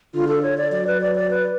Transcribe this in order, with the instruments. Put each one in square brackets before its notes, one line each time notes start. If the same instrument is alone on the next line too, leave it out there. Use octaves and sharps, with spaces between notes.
[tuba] D3 [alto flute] F4
[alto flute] A4
C#5
D5
[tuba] F#3 [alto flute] D5
[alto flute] B4
D5
D5
B4